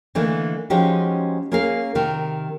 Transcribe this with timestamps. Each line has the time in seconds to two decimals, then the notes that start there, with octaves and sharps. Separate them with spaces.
0.15 D3 E3 A3 A#3 D#4
0.70 F3 G#3 C#4 D#4 F#4 G4
1.52 A#3 C#4 G#4 A#4 F5
1.95 C3 D#3 A#4